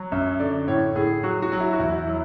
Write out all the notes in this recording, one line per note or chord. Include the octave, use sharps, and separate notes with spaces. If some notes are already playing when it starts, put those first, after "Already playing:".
Already playing: F#3
F#2 E5
D3 D5
A2 C#5
A2 G#4
F#3 F#4
F#4
F#3
E4
F#4
E2 E4
E4
F#3